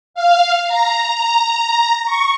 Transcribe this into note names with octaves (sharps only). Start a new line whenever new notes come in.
F5
A#5
A#5
C#6